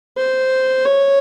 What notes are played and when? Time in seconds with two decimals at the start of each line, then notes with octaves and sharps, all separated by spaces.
0.18 C5
0.85 C#5